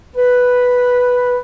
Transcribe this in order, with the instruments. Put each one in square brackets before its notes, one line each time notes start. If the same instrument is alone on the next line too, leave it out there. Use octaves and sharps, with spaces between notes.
[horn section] B4